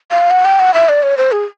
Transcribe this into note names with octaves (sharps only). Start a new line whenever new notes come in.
F5
F#5
G5
F#5
E5
D5
C#5
C5
G#4